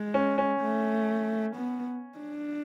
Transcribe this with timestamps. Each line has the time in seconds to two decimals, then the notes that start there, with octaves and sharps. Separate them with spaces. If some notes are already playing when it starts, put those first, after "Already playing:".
Already playing: G#3
0.14 C#4
0.38 C#4
0.61 A3
1.56 B3
2.18 D4